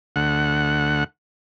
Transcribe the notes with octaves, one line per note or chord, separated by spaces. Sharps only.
D2 F#5